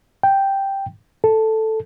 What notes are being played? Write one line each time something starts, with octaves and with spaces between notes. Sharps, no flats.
G5
A4